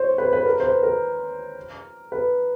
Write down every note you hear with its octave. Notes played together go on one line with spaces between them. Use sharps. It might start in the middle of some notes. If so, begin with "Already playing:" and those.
Already playing: C5 C#5
B4
C5
B4
A#4
C5
B4
A#4
B4